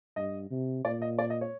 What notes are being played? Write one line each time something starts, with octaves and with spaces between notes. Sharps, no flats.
G2 D#5
C3
A#2 D5
D#5
D5
D#5
C#5